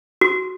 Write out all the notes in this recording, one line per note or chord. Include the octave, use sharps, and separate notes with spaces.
F#4